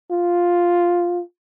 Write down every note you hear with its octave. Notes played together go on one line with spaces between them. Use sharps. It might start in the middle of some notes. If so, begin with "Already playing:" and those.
F4